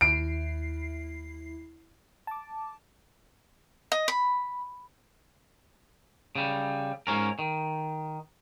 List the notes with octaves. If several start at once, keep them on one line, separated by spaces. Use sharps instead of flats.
D#2 E4 C7 D7
A5 D6
D#5
B5
C#3 G3
G#2 C#4 A#4
D#3